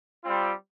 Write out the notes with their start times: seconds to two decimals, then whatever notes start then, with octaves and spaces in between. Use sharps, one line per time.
0.23 G3 C4 F4